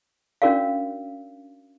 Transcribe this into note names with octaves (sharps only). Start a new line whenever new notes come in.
C#4 D4 F#4 A#4 D5 F5